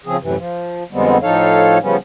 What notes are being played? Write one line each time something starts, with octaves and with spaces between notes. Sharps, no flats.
C#3 F3 C4 G#4
F#2 A2 C3 E3
F3
F2 D3 G3 G#3 B3 C4
A2 F3 D#4 A4 C#5 F5
C#3 F3 G3 B3 C#4